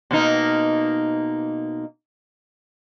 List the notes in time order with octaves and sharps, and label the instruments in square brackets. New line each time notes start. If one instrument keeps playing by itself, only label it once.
[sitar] B2 A#3 D#4